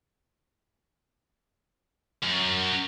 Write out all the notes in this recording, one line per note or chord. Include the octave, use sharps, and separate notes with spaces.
F#2